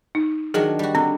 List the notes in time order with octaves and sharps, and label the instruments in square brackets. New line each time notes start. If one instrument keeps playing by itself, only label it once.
[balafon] D#4
[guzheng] D#3 F#3 D4 [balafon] G#4
[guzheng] G3 F#4
[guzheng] D3 [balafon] C4